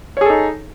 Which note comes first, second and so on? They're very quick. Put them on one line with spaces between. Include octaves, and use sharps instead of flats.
C#5 G#4 A4 D#4